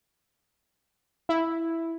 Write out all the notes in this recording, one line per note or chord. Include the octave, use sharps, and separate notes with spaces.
E4